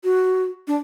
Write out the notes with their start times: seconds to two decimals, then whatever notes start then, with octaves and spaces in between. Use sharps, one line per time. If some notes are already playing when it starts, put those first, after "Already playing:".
0.04 F#4
0.68 D4